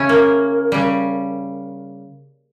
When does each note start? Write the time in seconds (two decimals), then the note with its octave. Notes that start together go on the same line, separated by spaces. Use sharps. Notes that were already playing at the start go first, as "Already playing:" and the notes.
Already playing: C#3 C#4 E4
0.09 A#3
0.72 C#3 G3